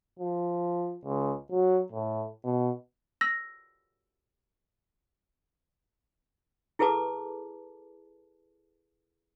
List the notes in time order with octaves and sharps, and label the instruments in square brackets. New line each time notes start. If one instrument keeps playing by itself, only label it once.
[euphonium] F3
C#2
F#3
A2
B2
[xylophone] E6 A#6
[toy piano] E4 G#4 A4 B4 A5 D6